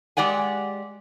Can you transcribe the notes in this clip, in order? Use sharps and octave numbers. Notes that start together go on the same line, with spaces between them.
G#3 G4 D5 F#5 G#5